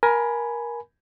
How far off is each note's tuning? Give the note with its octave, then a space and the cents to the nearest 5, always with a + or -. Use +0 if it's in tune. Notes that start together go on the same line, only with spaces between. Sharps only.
A#4 +20 G#5 +10 B5 +0